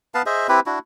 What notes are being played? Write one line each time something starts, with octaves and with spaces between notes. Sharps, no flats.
B3 B4 F5 A5
G#4 C5 D#5 E5
C4 E4 G4 B4
D4 E4 F#4